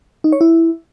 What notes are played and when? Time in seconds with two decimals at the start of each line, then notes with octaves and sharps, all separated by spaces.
0.24 D#4
0.32 C#5
0.41 E4